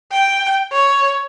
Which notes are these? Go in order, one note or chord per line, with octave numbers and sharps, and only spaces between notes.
G5
C#5